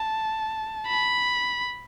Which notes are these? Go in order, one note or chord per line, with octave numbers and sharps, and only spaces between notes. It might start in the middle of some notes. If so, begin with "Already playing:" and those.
Already playing: A5
B5